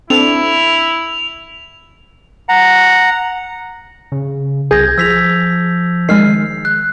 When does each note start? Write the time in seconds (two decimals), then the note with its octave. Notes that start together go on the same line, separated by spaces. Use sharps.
0.10 C4 D4 E4 A4 F7
2.49 F#5 A#5
4.12 C#3
4.71 C2 G#4 G6 G#6 A#6
4.98 F3 E6 B6 F7
6.09 D#3 G#3 F6 C7
6.65 F#6